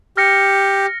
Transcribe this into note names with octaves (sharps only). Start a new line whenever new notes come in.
G4 F6 A#6 C#7